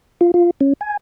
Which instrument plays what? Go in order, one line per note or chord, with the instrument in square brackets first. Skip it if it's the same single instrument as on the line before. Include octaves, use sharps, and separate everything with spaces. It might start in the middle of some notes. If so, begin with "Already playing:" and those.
[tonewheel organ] F4
F4
C#4
G#5